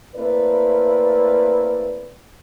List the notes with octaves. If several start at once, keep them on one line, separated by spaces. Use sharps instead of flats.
A3 A#3 C4 E4 B4 D5